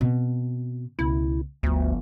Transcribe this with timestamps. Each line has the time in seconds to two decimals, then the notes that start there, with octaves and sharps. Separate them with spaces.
0.01 B2 C4
0.99 C#2 B2 E4
1.63 G1 D2 F3